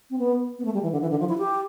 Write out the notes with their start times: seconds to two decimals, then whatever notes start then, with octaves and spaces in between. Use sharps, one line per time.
0.10 C4
0.19 B3
0.59 B3
0.65 A3
0.74 G3
0.83 E3
0.92 D3
1.01 E3
1.11 D3
1.20 F3
1.29 E4
1.38 G4